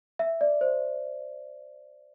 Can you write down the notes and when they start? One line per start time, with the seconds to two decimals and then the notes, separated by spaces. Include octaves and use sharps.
0.19 E5
0.41 D5
0.61 C5